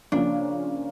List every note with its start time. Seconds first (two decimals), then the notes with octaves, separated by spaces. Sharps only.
0.12 C#3 F3 A#3 C#4 D4